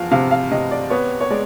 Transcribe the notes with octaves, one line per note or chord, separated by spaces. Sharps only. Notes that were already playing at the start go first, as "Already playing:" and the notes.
Already playing: E2 F3 F5
C3 F5
F5
C3 D#5
D5
B3 C#5
C#5
G#3 D5